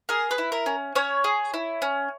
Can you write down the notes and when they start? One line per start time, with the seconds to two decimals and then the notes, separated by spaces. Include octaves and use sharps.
0.09 G#4 A#4
0.31 B4
0.38 E4
0.52 A#4
0.66 C#4
0.95 C#4 C#5
1.24 G#4
1.54 E4
1.82 C#4